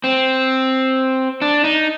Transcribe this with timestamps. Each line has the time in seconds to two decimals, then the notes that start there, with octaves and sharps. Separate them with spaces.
0.04 C4
1.42 D4
1.64 D#4